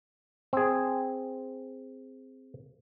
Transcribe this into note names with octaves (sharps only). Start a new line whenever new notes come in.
C4 G#4